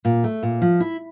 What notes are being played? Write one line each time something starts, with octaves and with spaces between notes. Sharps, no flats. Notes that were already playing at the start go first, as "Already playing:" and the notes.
A#2
A3
A#2
F3
E4